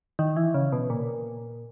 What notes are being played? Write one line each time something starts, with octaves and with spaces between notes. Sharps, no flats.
D#3
E3
C#3
B2
A#2